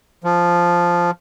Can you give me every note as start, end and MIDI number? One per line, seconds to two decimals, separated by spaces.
0.24 1.11 53